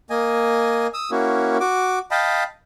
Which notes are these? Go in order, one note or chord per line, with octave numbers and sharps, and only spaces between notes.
A#3 D#5 G#5
D#6 E6
A#3 C#4 E4 F#4
F#4 D6
D#5 F5 G5 A5 B5